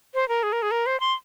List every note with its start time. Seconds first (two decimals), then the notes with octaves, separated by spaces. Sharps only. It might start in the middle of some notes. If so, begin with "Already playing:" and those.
0.14 C5
0.29 A#4
0.43 G#4
0.53 A#4
0.62 G#4
0.71 A#4
0.86 C5
1.00 C6